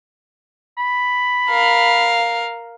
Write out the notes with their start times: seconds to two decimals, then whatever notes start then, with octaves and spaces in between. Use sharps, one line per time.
0.78 B5
1.49 A#4 F5